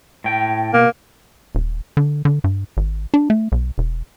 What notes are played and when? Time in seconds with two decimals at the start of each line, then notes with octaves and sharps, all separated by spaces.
0.24 A2 G5
0.74 B2 A#3
1.55 D#1
1.97 D3
2.25 D3
2.44 G2
2.77 G#1
3.14 D4
3.30 A3
3.52 B1
3.78 E1